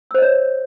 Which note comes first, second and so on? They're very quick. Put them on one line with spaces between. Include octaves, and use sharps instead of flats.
E6 C5 D#5 C#5